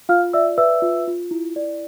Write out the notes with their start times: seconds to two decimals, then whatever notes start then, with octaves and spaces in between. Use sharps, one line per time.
0.09 F4 F5 F6
0.33 D5 E5 E6
0.58 B4 E5 E6
0.82 F4
1.07 F4
1.31 E4
1.56 D5